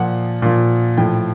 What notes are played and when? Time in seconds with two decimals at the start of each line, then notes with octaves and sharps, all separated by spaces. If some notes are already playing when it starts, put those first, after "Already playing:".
Already playing: A#2 F3 F#5
0.42 A#2 F3
0.98 A2 F3 G5